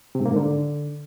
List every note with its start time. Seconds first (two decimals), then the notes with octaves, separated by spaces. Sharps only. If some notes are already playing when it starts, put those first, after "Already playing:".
0.15 C3
0.20 G#2
0.26 A#3
0.31 G#2
0.36 D3